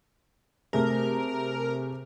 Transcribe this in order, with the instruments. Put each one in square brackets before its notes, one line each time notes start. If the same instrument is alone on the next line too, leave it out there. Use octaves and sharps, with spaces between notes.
[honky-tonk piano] C3 A3 G#4 [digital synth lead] A#4